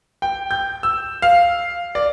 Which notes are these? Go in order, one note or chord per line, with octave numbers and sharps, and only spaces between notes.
G5
G6
E6
F5
D5